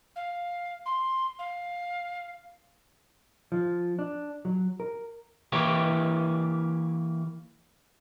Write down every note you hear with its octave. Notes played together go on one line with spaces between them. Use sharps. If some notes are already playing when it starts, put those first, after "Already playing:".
F5
C6
F5
F3
D4
F#3
A#4
E3 A#3 E4 G4 C#5